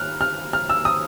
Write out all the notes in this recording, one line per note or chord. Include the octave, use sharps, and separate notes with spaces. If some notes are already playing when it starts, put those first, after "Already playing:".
Already playing: F6 F#6
F6
F6
E6
D#6